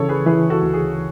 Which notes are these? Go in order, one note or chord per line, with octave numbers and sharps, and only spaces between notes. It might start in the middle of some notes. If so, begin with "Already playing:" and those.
Already playing: C#3 E3 A4 C#5
G#4 B4
E3 G#4 B4
F#4 A4
D2
G#4